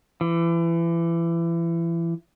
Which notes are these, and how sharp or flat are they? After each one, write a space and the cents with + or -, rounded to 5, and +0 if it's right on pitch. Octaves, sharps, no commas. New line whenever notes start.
E3 +30